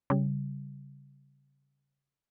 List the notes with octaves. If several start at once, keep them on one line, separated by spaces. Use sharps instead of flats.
C#3 G3